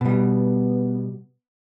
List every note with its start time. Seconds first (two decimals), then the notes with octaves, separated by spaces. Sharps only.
0.01 B2 G3 B3